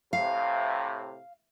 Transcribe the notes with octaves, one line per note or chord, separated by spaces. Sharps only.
A2 C3 F5